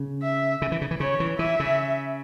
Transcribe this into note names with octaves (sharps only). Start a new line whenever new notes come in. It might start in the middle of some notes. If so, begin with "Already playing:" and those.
Already playing: C#3
E5
C#3
E3
C#3
E3
C#3 C#5
E3
E3 E5
C#3